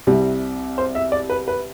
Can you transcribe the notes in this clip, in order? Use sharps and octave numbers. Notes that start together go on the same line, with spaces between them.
C2 C3 G3
C5
E5
D5
B4
B4